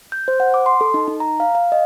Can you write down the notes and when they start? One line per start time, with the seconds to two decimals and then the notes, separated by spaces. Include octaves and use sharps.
0.12 G6
0.28 C5
0.40 F#5
0.54 D6
0.66 C6
0.81 A4
0.94 D#4
1.08 D#4
1.20 A#5
1.40 F5
1.55 F5
1.72 D#5